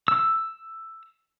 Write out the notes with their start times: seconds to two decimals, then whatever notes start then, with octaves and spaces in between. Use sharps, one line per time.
0.08 E6